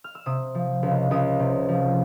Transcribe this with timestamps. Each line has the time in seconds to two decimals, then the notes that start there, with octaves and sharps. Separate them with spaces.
0.04 F6
0.15 E6
0.26 C3 D#6
0.55 F3
0.83 C#2
1.11 C#2 D#6
1.39 C3
1.69 F3